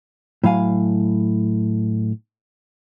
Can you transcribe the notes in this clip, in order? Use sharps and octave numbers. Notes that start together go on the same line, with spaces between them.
A2 F#3 F5 G#5